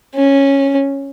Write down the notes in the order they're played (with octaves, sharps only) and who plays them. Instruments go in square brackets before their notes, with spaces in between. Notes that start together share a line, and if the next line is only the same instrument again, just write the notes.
[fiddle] C#4